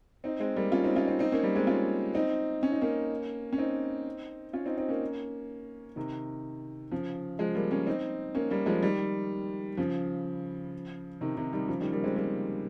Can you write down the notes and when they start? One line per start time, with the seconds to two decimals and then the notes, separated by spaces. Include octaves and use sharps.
0.24 C4 D#4
0.40 G#3 C4
0.56 G3 A#3
0.72 C#4 F4
0.84 C4 D#4
0.95 C#4 F4
1.07 C4 D#4
1.19 C4 D#4
1.32 A#3 C#4
1.43 G3 A#3
1.55 G#3 C4
1.67 C#4 F4
2.15 C4 D#4
2.63 C#4
2.72 D#4
2.81 A#3 C#4
3.53 C#4
3.58 C4 D#4
4.53 C#4 F4
4.66 C4 D#4
4.78 C4 D#4
4.89 A#3 C#4
5.96 C3 D#3
6.91 C#3 F3
7.39 F3 G#3
7.55 G3 A#3
7.71 A#3 C#4
7.87 C4 D#4
8.35 A#3 C#4
8.50 G3 A#3
8.66 F3 G#3
8.83 D#3 G3
9.77 C#3 F3
11.21 C3 D#3
11.36 C3 D#3
11.52 D#3 G3
11.68 C#3 F3
11.80 D#3 G3
11.92 G3 A#3
12.04 G#3 C4
12.16 G3 A#3